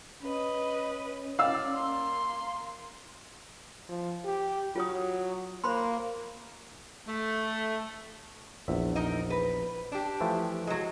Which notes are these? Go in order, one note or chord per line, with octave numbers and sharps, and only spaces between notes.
C#4 B4 D#5
D5 F5 E6
A#3 C6
F3
G4
F#3 F4 C#5 D#6
A#3 C5 B5 C6
A3
A#1 E2 E5
D#4 A#4 D#5
B4
D4 G4
E3 F3 A3
F#3 G#3